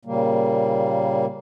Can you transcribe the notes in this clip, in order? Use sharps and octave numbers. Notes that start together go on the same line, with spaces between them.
A#2 C#3 G3 A#3